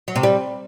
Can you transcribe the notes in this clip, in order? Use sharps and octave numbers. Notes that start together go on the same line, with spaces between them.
F#3
C3
G3